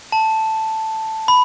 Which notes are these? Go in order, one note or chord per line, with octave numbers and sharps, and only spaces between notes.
A5
B5